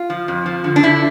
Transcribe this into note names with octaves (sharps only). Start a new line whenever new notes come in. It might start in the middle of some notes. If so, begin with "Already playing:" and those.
Already playing: F4
F3
F2
F3
D3
D4
D3 E4